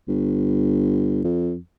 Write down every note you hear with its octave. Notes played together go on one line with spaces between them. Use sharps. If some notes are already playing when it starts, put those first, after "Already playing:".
G1
F2